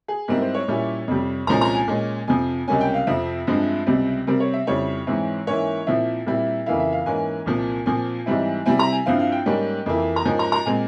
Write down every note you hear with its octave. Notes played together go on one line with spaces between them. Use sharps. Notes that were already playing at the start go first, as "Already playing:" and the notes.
G#4
G#2 G3 C4 E4 A#4
C5
C#5
A#2 G3 C#4 E4
F2 C3 G3
C2 A#2 F3 G#3 C#4 A#5
A#5
G#5
A#2 G#3 C#4
F2 C3 F3 G#5
C#2 C3 G3 A#3 C#4 G#5
G5
F5
F2 C3 F3 C4 E5
G2 F3 G#3 C4
C#2 C3 G3 C4
C3 G3 C4 A#4
C#5
E5
F2 C#3 G3 C4 E4 C#5
G#2 E3 G#3 C4 E4
G#2 E3 A#3 C#4 E4 C#5
A#2 F3 C4 E4 E5
A#2 G3 C4 E4
F2 C#3 E3 A#3 E4 F5
E5
F5
G#2 E3 A#3 C#4 G#5
C2 A#2 F3 A#3
A#2 F3 C4 G#5
G#2 E3 G3 C4 E4
C3 G3 C4 E4 G#5
A#5
G#5
G2 F3 C4 E4 F5
F5
G5
G#2 G3 A#3 C#4
F2 E3 A#3 E4
A#5
G#2 F3 A#3 C#4 G#5
A#5
A#5
A#2 G#3 C4 G#5